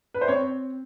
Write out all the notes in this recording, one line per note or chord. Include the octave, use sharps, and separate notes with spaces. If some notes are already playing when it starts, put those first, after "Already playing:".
B4
C5
C4 C#5